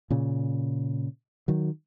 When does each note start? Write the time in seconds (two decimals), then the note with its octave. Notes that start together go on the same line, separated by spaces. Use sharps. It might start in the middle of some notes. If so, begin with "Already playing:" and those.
0.10 A#2 C#3
1.48 D#3 F#3